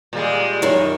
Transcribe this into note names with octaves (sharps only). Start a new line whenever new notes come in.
A#2 G3 G#3
F#2 D#3